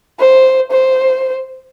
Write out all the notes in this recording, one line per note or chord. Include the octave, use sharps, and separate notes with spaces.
C5
C5